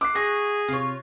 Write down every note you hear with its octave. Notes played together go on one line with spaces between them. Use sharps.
D6 E6 F#6 C7
F#4 G#4 A#6
C3 F4 C#5